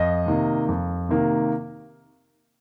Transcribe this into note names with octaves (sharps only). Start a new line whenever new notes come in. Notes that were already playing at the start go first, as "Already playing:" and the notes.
Already playing: F2 D#5
C3 D#3 A#3
F2
C3 D#3 A#3